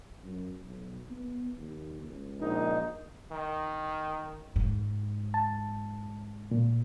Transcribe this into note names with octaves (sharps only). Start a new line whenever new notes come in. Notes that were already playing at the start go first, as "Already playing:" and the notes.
F#2
B1
B3
D#2
C#2
A#1 D#4
D#3
G#2
A5
A#2